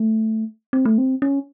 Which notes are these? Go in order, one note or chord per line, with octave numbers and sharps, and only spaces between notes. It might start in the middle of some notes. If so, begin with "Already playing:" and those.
Already playing: A3
C4
A3
C4
C#4